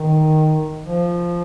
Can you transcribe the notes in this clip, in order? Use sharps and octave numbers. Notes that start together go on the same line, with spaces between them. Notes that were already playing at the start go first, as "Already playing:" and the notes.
Already playing: D#3
F3